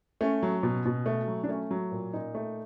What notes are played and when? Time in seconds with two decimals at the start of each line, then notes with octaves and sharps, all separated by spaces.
0.21 A3 C#4
0.43 F#3
0.63 B2
0.86 B2
1.06 A3
1.28 F#3
1.44 D4
1.49 A3 C#4
1.71 F#3
1.92 A#2
2.13 A#2 D#4
2.35 A3